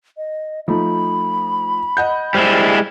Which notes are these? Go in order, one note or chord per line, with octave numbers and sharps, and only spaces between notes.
D#5
F3 A3 D#4 B5
D#5 F#5 G6
G3 G#3 E4 C5 F6